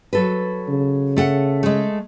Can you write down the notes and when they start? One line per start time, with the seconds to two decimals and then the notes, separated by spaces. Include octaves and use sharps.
0.13 F#3 A4 B4
0.68 C#3
1.16 A3 A4 F#5
1.63 G#3 A3